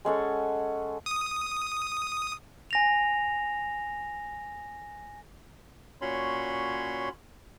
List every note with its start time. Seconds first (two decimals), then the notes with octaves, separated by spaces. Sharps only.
0.05 G#3 C#4 A4 F#5
1.06 D#6
2.71 G#5 A#6 F7
6.01 A#2 C#4 F#4 C#5 B5 C6